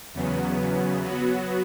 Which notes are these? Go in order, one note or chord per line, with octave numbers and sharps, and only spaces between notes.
E2 C#3 F#3 B3
F#3 B3 F#4